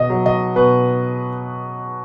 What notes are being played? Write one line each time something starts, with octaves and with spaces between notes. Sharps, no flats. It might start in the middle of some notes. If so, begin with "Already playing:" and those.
Already playing: B2 D#5
F#3
D#5
B2 B4